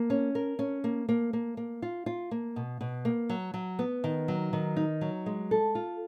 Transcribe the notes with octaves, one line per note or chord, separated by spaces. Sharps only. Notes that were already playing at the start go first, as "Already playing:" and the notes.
Already playing: A#3
C#4
A#4
C#4
A#3
A#3
A#3
A#3
F4
F4
A#3
B2
B2
A#3
F#3
F#3
B3
D#3
F#3
D#3
D#4
F#3
G#3
A4
F4